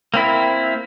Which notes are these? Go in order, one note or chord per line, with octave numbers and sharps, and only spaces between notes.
A#3 C4 E4